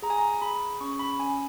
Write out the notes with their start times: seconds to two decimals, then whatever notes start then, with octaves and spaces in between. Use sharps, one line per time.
0.02 G#4 A#5
0.10 G#5
0.18 A#5
0.42 G#4 B5
0.81 C#4 C#6
0.99 B5
1.19 C#4 G#5